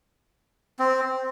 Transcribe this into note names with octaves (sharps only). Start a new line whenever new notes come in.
C4